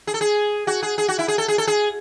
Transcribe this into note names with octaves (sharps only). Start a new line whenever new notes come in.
G#4
A4
G#4
F#4
G#4
G#4
F#4
E4
G#4
A4
G#4
A4
G#4